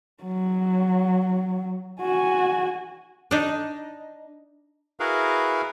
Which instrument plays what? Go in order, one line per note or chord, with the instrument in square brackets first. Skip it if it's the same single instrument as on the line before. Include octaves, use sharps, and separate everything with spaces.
[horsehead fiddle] F#3
F#4 G#5
[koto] D4 D#4
[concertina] E4 F#4 G#4 A#4 B4 F5